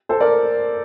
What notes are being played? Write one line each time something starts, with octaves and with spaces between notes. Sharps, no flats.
A4 C5
A#4 D5